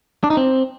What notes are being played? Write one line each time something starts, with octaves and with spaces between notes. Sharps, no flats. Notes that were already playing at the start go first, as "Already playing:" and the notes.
D4
D#4
C4